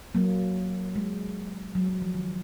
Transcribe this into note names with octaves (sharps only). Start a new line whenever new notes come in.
F#3 A#3
G#3
F#3
F#3
F3
D#3